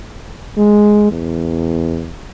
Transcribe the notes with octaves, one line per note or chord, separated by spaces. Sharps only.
G#3
E2